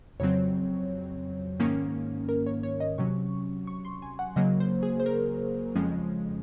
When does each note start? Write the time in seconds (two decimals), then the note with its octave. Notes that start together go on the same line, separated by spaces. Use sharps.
0.20 F2 C#3 F#3 C4 C#5
1.60 G#2 D#3 A#3 C#4
2.29 A#4
2.46 C#5
2.63 C#5
2.80 D#5
2.98 C3 F#3 C#4 C#6
3.67 C#6
3.85 C6
4.02 G#5
4.19 F#5
4.36 C#3 F#3 A#3 D#5
4.60 C5
4.83 G#4
5.00 C5
5.06 A#4
5.76 F2 C#3 F3 G#3 C#4